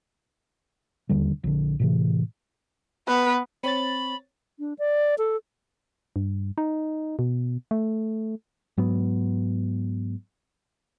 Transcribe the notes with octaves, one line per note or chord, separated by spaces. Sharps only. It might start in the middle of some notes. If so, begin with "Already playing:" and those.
E1 D#2 D3 G3
A#1 D3
A2 C3 E3
B3 B4
C4 C#5 B5 A6
D4
D5
A4
G2
D#4
B2
A3
G#2 F#3 B3